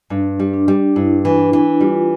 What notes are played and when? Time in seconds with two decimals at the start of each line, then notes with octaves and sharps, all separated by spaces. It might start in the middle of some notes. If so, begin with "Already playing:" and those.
0.10 G2 D4
0.40 G3
0.53 D4
0.68 G3
0.96 G2 E4
1.25 E3
1.38 D4
1.53 E3
1.81 G3 F4